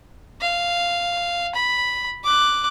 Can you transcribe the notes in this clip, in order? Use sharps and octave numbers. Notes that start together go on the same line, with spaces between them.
F5
B5
D6 F#6